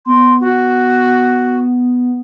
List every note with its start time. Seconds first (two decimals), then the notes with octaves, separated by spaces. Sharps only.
0.06 B3 C6
0.41 F#4